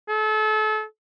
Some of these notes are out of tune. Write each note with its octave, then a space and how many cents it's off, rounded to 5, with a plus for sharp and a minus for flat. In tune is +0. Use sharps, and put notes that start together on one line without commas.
A4 -35